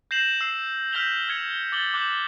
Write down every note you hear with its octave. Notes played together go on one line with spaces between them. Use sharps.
G6 A#6 C7 E7 F#7
E6 C7 E7
F6 G6 A#6 B6 F7 G7
F6 G#6 C#7 E7 F7
D6 A6 F#7 G7
D6 F#6 G6 E7 F#7